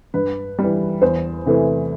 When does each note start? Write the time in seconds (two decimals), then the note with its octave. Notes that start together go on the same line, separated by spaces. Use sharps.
0.14 G2 B4
0.59 E3 G3
1.02 E2 C5
1.46 C3 E3 A3